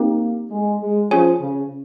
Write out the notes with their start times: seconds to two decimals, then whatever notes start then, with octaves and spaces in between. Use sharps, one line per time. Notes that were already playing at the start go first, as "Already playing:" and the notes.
Already playing: A#3 C4 D#4 G4
0.50 G#3
0.80 G#3
1.11 F3 C#4 G#4 C#5 G#5
1.41 C#3